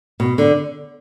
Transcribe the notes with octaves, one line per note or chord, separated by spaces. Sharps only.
B2
D3